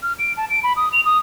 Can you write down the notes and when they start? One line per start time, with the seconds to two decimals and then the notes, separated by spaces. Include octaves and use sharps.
0.03 F6
0.19 D7
0.37 A5
0.50 D7
0.63 B5
0.76 D#6
0.93 F7
1.05 D#6